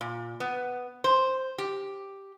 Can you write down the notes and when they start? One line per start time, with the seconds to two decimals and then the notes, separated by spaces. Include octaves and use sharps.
0.01 A#2
0.40 B3
1.04 C5
1.58 G4